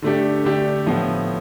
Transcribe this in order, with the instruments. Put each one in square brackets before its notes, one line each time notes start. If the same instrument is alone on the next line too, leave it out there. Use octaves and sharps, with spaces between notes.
[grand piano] D3 A3 D4 G4
D3 A3 D4 G4
A2 F3 B3